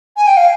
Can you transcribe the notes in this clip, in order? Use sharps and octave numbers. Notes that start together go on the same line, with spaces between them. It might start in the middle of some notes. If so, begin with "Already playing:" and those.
G#5
G5
F5